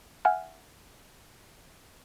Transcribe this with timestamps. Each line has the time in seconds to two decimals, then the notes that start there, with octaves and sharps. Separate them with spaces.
0.25 E5 F#5 G#5 F6